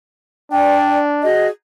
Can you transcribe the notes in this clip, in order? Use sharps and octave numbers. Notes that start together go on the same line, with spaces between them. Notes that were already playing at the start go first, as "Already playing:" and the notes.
D4 D5 G5
F#4 G#4 D#5